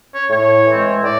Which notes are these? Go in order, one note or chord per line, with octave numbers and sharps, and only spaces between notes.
C#5
A2 C#5
E3 G#3 C4
A2 D5